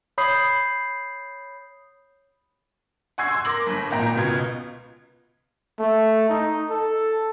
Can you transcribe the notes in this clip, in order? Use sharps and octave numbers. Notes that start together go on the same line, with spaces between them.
C#5 B5 D#6 G6 C7
F#5 G#5 C#6 E6 G#6 C7
C6 E6
A#4 C6 D6 A#6 F#7
G1
G#1 A#2 A#3 G5 A#5
C#2 B2 B3 F4 G#6
A3
D#4
A4